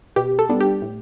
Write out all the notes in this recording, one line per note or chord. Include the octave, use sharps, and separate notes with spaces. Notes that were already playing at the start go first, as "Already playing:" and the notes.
B2 G4
A4
G3 B3 D4
G4
A2